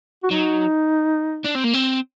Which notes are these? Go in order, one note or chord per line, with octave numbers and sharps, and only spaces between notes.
F#4
F#3 D#4
D4
C4
A#3
C4